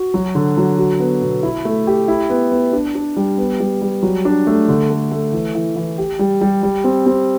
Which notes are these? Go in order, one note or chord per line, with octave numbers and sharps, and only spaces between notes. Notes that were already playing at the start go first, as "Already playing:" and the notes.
Already playing: F#4
F#3
D3
F#3
F#4
B3
B2
E4
A3
G4
E4
B3
B3
D4
D4
G3
B3
G3
G3
F#3
D4
A3
D3
A3
A3
E3
E3
E3
G4
G3
G3
G3
C4
C4